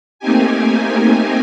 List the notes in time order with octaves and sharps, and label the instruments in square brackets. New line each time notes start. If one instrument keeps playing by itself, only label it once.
[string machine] A3 A#3 C4 D#4 G4 G#5